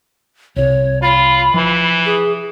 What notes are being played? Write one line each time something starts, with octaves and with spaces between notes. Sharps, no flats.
C2 C3 C#5
F4 B5
E3 F3
G#4